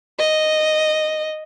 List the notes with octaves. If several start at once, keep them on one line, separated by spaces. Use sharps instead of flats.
D#5